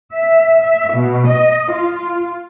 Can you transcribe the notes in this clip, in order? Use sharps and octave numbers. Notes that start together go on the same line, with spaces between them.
E5
E5
B2
D#5
F4